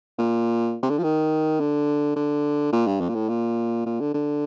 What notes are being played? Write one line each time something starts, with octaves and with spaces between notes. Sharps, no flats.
A#2
C3
D3
F3
D#3
D3
D3
A#2
G2
F2
A#2
A2
A#2
A#2
D3
D3